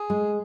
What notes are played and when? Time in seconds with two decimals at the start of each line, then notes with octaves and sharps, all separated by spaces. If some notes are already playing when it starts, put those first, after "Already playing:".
Already playing: G#4
0.10 G#3